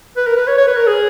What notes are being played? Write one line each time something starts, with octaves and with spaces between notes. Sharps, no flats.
B4
A#4
B4
C#5
C#5
B4
A#4
G#4